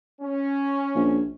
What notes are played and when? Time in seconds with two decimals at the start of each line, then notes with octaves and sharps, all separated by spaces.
0.21 C#4
0.95 A#1